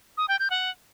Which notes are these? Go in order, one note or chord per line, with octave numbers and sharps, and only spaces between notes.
D#6
G5
G6
F#5